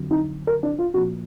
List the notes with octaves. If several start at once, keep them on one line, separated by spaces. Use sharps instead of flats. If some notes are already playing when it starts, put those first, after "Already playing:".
Already playing: F2 D3 F#3
D#4
A#4
D4
F4
A#2 F3 F#4